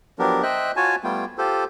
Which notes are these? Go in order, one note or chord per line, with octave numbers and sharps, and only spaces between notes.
F3 F#3 B3 D4 G4 A#4
C5 D#5 E5 G5 F#6
F4 F#4 C#5 G#5 A5
G3 A3 B3 F4 G5
F4 G4 A4 C5